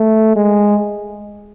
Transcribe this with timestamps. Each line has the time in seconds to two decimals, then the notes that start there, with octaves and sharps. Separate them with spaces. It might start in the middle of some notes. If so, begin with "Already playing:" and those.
Already playing: A3
0.36 G#3